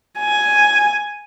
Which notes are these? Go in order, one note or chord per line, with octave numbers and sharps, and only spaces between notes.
G#5